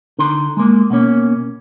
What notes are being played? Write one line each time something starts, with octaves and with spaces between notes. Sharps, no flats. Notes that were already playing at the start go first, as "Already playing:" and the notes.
D3 D#4 C6
G#3 A#3
B2 A#3 C#4